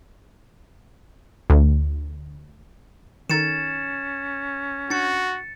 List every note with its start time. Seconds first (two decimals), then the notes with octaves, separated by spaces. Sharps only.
1.50 D2
3.30 D#3 C#4 D#4 A4 A6 C#7 E7
4.90 D4 F#4 A6 C#7